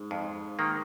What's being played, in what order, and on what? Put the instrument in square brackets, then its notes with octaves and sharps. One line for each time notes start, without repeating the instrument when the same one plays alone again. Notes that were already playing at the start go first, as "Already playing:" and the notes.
Already playing: [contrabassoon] G#2
[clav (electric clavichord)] F2
D#3 A#3